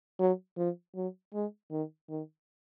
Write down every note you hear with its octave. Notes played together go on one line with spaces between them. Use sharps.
F#3
F3
F#3
G#3
D#3
D#3